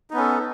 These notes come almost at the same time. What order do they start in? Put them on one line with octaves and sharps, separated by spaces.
D#4 B3 C#4 A4